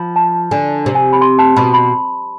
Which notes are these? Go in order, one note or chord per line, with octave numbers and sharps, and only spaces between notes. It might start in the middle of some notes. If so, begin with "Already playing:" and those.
Already playing: F3 B5
A5
D3 G#5
C3
G#5
B5
C6
A5
B2 B5
B5